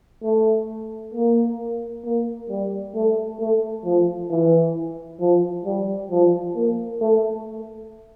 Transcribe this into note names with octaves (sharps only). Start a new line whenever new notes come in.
A3
A#3
A#3
G3
A3
A3
F3
E3
F3
G3
F3
A#3
A3